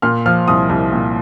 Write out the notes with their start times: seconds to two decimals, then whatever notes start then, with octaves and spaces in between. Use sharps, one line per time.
0.02 A#2 F6
0.26 F3 F6
0.48 C2 D#6
0.69 C2
0.93 A#2